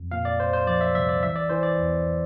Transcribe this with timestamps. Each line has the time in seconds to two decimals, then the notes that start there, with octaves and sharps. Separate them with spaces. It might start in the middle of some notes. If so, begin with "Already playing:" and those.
Already playing: F2
0.11 A#2 F5
0.25 D5
0.39 C2 C5
0.53 C5
0.67 F3 D5
0.81 E5
0.95 C2 E5
1.09 D5
1.23 E3 E5
1.36 D5
1.49 E3 C5
1.63 D5
1.78 E2